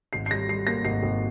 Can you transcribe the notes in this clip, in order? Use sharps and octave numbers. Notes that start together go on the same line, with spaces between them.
G#1 C7
C7
G3 A#6
G3 C7
A#3 A#6
G#1 C7
G#1